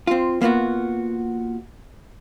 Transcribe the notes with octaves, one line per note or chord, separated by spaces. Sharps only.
C4 F4
A#3 B3 F4 F#4